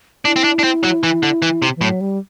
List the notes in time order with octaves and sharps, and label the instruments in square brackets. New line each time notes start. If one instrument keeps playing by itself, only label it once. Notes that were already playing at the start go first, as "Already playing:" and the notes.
[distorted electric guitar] D4 [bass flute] E4
[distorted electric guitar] C4
D4
D4
C4
F#3
E3
D3
E3
C3
[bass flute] E3
[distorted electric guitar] A2 [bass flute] F#3
[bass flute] G3